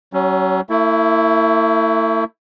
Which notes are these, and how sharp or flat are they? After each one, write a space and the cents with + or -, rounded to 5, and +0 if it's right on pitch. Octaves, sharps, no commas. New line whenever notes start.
F#3 +35 C#4 +0
A3 +40 E4 +0